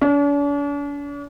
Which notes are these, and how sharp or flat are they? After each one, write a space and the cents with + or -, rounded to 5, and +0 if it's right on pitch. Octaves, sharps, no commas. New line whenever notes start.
D4 -45